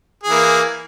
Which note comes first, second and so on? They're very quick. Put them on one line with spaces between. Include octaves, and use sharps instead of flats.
G#4 E3 A#3